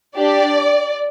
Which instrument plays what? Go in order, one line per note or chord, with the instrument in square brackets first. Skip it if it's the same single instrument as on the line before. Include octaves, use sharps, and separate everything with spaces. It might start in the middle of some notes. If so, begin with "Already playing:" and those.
[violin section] D4 G4 D5